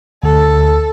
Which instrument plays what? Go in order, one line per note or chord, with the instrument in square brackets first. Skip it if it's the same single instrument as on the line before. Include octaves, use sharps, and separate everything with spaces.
[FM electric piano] D2 [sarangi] A4